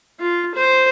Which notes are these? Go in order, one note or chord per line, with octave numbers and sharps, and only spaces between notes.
F4
C5